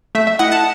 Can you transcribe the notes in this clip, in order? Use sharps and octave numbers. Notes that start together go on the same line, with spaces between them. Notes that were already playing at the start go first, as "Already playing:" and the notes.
A3 E5
E5
E4 D#5 F#5
F#5 A5